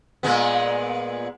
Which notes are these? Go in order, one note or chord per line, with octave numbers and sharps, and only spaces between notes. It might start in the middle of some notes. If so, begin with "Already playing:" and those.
A#2 G#3 B3